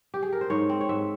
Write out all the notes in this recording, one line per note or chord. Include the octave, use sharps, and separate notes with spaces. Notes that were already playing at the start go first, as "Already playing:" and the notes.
G4
G#4
A#4
C5
G#2 C#5
C4
C#5
G#2 E5